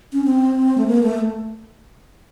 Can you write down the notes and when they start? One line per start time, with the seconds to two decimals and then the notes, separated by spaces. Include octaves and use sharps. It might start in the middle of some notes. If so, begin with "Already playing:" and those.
0.13 C#4
0.25 C4
0.78 A3
0.88 A#3
1.03 A3